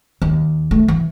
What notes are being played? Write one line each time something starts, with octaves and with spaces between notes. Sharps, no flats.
D#2
A3
E3